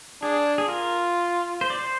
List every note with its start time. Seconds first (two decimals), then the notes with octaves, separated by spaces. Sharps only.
0.22 D4 G#4
0.58 G#4
0.68 F4 A#4
1.61 C5
1.70 D5
1.79 C5